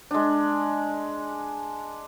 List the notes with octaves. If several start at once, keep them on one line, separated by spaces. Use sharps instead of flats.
G#3 D4